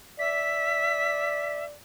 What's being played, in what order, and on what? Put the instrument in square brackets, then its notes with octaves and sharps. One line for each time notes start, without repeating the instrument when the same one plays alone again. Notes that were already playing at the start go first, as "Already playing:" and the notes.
[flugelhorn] D5 [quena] E5 [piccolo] B6